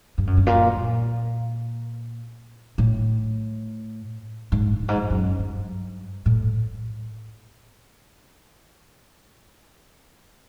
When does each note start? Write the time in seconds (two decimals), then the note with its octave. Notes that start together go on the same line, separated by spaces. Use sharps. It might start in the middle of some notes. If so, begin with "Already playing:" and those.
0.18 G2
0.27 F#2
0.37 G2
0.47 A#2
0.76 A#2
2.78 A2
4.52 G#2
4.81 G2
4.88 G#2
4.96 G2
5.10 F#2
5.39 G2
6.26 A2